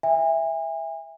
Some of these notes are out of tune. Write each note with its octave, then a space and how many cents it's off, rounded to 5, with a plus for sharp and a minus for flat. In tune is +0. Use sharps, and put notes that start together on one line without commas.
E5 +0 G#5 -40